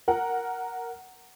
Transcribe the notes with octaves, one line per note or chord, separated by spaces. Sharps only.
A#4 F#5